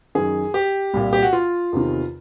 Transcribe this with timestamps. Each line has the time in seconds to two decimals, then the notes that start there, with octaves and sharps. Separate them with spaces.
0.15 F#2 D#3 G#4
0.54 G4
0.94 C2 A#2
1.13 G4
1.23 F#4
1.33 F4
1.73 E2 C3 D#3